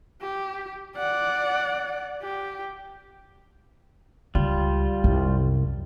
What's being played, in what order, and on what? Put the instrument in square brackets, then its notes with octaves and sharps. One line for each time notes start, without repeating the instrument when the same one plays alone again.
[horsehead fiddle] G4
D5 F#5
G4
[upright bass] C#2 [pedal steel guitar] G3 F4
[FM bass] C2 [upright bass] F#2